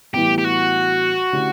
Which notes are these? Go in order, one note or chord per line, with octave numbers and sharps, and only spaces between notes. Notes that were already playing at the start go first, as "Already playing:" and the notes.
A2 E3 G3 B3 E4 G4
G4
F#4
D3 A3 C#4 E4 G4